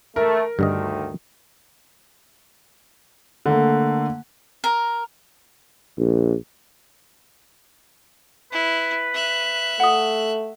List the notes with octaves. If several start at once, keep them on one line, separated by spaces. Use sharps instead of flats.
A3 A#4
D2 G2 D3 D#3 D#5
D3 A3 A#3
A#4
A#1
E4 B4
E5 F#6
A3 F#5 D#6